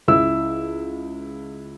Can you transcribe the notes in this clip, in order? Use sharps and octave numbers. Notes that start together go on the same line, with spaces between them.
C#2 E4 E6